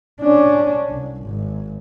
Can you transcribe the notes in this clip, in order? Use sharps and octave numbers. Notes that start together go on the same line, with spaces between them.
C#4 D4
C2
G#1